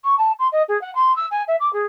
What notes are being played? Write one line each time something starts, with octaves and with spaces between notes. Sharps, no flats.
C#6
A5
C6
D#5
G#4
F#5
C6
E6
G#5
E5
D6
G#4